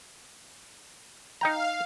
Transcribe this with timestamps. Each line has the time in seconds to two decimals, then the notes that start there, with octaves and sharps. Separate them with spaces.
1.41 D#4 F5 G5 A#5